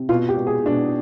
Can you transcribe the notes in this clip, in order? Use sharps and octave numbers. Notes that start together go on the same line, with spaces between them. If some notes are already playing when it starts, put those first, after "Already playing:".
Already playing: C3
B2 F4
G4
B2
G#4
B2 D4